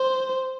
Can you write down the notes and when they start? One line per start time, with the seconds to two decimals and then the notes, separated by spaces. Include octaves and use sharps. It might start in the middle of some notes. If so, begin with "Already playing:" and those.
Already playing: C5